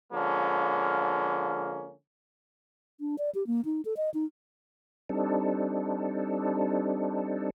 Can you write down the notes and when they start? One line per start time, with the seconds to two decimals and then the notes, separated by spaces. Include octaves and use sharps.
0.13 D3 F3 G#3 A#3 C#4
3.00 D4
3.18 D5
3.35 G4
3.47 A#3
3.65 D#4
3.85 A4
3.97 D#5
4.14 D#4
5.09 G3 C4 D4 D#4 A4